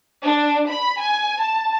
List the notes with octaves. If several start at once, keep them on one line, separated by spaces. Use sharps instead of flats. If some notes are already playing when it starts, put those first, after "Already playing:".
D4
B5
G#5
A5